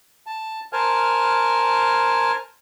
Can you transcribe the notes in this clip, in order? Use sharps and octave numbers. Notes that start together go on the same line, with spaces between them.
A5
A#4 C5 G#5 A5 F6